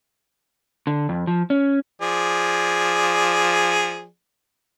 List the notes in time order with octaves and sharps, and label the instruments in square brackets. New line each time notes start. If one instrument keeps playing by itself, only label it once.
[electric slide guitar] D3
F2
F3
C#4
[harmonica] F3 G#4 D5